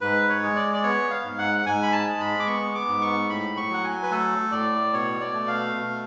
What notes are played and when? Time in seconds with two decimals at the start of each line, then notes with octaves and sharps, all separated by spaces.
0.01 G#2 B4
0.29 C#5
0.43 G#3
0.56 D5
0.73 D5
0.83 B3 C#5
1.10 F5
1.24 G#2
1.38 F#5
1.59 F#5
1.66 G#2 G#5
1.83 B5
1.92 A5
2.06 G#3
2.20 B5
2.40 D6
2.47 B3 C#6
2.75 D6
2.89 G#2
3.02 C#6
3.29 A2 B5
3.57 C#6
3.70 F#3 F#5
3.84 G#5
4.03 B4
4.11 A3 A4
4.52 A2 D5
4.93 B2 C#5
5.21 D5
5.34 A3
5.48 F5
5.75 B2